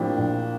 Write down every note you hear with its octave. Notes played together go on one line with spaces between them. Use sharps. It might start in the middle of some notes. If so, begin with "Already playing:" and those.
Already playing: A2 F3 A#3 C4 D4 G4
A#1